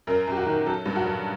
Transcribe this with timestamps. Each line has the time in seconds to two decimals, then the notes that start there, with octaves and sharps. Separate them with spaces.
0.07 F#2 A#4
0.27 F#2 G4
0.37 F#4
0.46 D#3
0.66 F#3 A4
0.86 G2
0.96 F#4
1.05 F#3